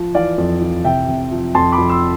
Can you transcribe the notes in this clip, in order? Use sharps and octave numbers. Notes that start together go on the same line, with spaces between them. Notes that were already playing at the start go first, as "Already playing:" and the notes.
Already playing: F3
E3 D5 F5
F2
E3
C3 E5 G5
C3
F3
F2 A5 C6
B5 D6
F2
C6 E6